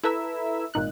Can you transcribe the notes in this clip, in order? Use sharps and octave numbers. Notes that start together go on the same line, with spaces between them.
E4 A4 B4 E5 A#5 E6
G#1 A#2 D#4 F#6